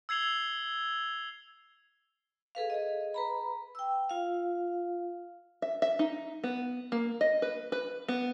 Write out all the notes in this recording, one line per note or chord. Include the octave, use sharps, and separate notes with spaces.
E6 G#6 C7 F7 G7
G#4 A4 B4 F5
G#4 D#5
B4 A#5 B5
G5 E6
F4 F5
E5
E5
D#4
B3
A#3
D#5
B4
B4
B3